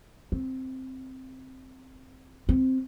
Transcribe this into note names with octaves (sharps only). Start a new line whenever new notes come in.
C4
C4